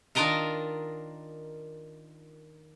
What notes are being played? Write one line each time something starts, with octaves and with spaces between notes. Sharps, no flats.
D#3 D4 F4 A#4 D#5 F5